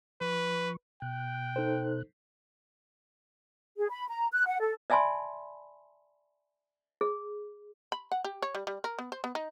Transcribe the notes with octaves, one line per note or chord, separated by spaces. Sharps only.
F3 B4 C#6
B2 G5 F#6
D#4 A4 C5
G#4
B5
A#5
F#6
F#5
A4
D5 E5 G#5 A5 B5 C6
G#4
B5
F#5
G4
C#5
G3
G3
A#4
B3
C5
B3
D#4